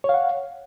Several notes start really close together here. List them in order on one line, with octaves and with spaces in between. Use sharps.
C#5 F5 F#5